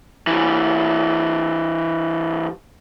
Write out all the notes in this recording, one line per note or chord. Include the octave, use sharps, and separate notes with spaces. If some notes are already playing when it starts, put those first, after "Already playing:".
E3 G3